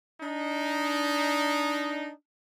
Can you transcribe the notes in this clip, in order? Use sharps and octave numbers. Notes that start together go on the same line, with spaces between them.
D4 D#4